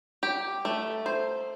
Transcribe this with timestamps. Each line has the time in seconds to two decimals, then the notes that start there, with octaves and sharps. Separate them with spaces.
0.23 G4
0.65 A3
1.06 C5